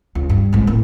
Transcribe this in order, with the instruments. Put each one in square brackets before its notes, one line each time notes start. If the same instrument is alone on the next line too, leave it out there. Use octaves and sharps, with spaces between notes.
[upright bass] C#2
G2
A1 G#2
A2 A#3